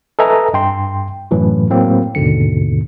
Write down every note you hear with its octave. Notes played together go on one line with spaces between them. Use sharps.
A4 B4 D#5 E5 G#5 A#5
G2 G5 C6
F#2 A2 E3 F#3
A2 F#3 A#3 C4
D#2 G#2 B2 D3 C#7